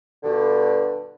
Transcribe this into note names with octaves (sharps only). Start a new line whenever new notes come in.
G2 B2 D3